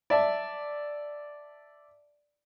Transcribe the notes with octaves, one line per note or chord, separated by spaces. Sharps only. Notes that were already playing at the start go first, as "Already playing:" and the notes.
D5 E5 A5